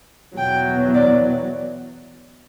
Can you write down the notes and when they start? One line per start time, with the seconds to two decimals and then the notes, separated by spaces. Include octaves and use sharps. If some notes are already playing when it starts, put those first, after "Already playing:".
0.37 E2 B2 F#3 G5
0.94 D5